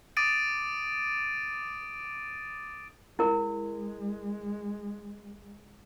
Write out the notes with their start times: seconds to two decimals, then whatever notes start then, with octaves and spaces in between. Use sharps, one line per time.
0.17 D6 D#6 A6 D7 D#7
3.19 G#3 E4 A#4